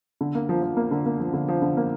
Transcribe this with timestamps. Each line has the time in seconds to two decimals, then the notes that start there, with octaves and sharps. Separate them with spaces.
0.21 D3
0.35 A#3
0.49 F3
0.62 F3
0.77 A#3
0.91 D3
1.06 A#3
1.20 F3
1.34 D3
1.48 F3
1.62 D3
1.77 A#3